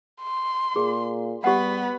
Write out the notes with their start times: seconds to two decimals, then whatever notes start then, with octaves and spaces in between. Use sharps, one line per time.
0.22 C6
0.76 A#2 G#4
1.44 G3 B3 G4 F#5 B5